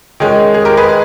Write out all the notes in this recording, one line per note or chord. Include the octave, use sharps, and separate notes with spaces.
D#3 G#3 C#4 G#4
G#4
G4 A#4
G#4 B4